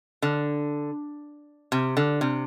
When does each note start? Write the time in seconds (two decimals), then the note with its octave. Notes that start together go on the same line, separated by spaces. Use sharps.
0.22 D3
1.72 C3
1.97 D3
2.21 C3